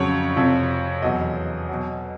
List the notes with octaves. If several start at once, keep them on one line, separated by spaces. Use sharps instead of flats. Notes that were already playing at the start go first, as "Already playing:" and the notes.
Already playing: F2 C#3 F#3 C#5
F2 C3 F3
E2 B2 F#3 D#5
B2 F#3